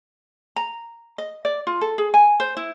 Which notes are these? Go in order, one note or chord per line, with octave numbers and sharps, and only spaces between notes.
A#5
D#5
D5
F4
A4
G#4
G#5
C5
E4